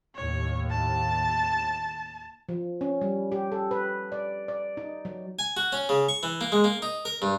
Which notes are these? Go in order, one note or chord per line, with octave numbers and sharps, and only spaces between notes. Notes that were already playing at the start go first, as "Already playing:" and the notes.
D#2 A2 C#5
A5
F3
C#4
G3
G4
A4
B4
D5
D5
D#4
F#3
G#5
F#4
C#4
C#3
C#6
E3
A#3
G#3
A#3
D#4
A#4
G2